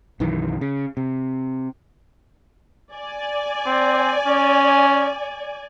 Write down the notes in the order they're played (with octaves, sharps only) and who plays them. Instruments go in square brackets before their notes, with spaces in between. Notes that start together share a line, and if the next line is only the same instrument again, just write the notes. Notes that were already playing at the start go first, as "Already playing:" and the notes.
[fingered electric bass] B1 F#2 D#3 E3
C#3
C3
[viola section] D5 G#5
[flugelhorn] C4
C#4